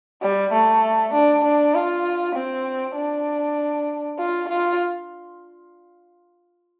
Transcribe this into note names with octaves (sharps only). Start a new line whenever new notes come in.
G3
A3
D4
D4
F4
C4
D4
F4
F4